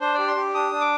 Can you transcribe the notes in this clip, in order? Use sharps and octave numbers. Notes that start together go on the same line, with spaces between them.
D4 C5
G4 D5
C6
G4
D4 D#6
D4
D6